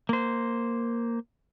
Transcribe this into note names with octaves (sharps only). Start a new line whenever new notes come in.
A#3 C5